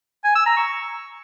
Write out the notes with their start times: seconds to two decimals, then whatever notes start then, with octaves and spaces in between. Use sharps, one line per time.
0.24 G#5
0.35 E6
0.46 A#5
0.57 C#6